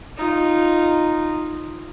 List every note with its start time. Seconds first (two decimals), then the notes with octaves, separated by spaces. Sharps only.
0.17 D#4 F4